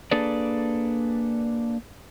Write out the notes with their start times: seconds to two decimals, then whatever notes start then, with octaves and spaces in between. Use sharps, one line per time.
0.11 A#3 D4 G#4 A4 B4 D5